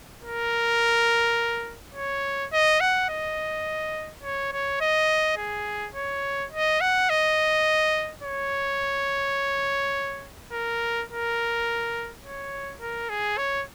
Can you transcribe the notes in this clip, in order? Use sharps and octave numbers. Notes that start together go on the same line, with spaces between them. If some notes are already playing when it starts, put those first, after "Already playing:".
A#4
C#5
D#5
F#5
D#5
C#5
C#5
D#5
G#4
C#5
D#5
F#5
D#5
C#5
A#4
A#4
C#5
A#4
G#4
C#5